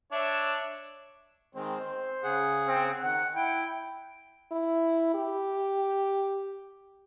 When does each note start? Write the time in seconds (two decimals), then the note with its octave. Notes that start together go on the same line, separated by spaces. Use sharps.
0.12 D4 C#5 E5
1.55 D#3 G#3 C4 C5
1.84 C4
2.23 C#3 G#4 F#5
2.68 C4
3.03 D#3 F#5
3.35 E4 G5
4.52 E4
5.14 G4